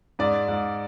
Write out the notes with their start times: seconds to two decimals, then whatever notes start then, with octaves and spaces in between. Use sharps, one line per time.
0.19 G#2 D5
0.48 G#2